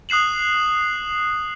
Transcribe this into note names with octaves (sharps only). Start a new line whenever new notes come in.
D#6 F#6 C7 E7 F#7